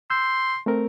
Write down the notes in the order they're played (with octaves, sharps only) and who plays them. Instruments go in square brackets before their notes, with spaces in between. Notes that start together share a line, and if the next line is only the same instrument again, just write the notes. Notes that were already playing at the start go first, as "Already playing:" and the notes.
[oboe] C6 [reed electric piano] E6 G6
[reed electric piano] A3 C4 A#4